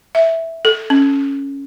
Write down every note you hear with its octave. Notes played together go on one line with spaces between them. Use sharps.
E5
A4
C#4